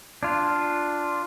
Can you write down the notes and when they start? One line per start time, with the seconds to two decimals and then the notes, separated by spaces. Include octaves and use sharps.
0.23 D4 F4